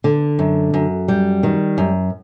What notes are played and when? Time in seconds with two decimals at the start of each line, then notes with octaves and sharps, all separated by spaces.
0.04 D3
0.39 F#2
0.74 F#2
1.08 G3
1.43 D#3
1.78 F#2